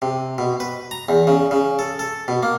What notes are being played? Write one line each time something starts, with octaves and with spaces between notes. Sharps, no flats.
C3
B2
B4
A#5
E2
C#3
C#3
A4
A4
B2
A#3